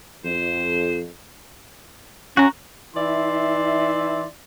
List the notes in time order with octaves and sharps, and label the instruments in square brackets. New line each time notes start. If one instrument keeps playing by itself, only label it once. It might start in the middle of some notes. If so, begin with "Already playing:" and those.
[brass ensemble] F2 [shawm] C5
[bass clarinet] C#4 [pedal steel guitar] F#4 A#5
[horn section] E3 D#4 E4 D5 E5 C6